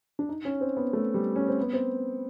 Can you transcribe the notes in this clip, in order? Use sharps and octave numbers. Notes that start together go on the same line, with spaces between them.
D4
D#4
C#4
C4
B3
A3
G3
C#4
C4
B3
C4